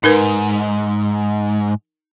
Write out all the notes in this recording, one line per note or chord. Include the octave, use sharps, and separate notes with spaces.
G#2 D#4 A#4 B4